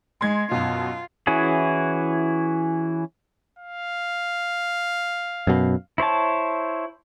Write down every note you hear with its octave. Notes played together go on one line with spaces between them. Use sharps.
G#3 C6 G#6
F#2 B2 F4
E3 C#4 E4 F#4 G#4
F5
F#2 B2
E4 C5 C#5 A5